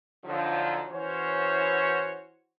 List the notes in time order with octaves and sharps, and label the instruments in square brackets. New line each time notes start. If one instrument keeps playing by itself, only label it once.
[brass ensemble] D3 F3 F#3 D#4
E3 C#4 F#4 C5 C#5